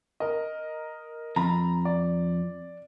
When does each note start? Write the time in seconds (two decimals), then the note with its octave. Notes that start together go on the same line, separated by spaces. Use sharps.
0.20 A#4 D#5
1.36 F2 A#5 B5
1.85 D5